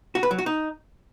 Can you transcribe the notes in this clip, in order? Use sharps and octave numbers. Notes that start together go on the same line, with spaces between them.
F#4
B4
F#3
F#4
D#4